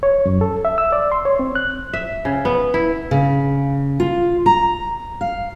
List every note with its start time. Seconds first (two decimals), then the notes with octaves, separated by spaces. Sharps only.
0.03 C#5
0.26 F#2
0.41 A4
0.65 E5
0.78 E6
0.92 D5
1.12 C6
1.25 C#5
1.39 C4
1.55 F#6
1.93 E5
2.25 C#3
2.45 B3
2.74 E4
3.11 C#3
4.00 F4
4.46 A#5
5.21 F5